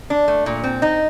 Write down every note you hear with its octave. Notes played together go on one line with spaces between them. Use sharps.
D4
A3
A#2
C4
D#4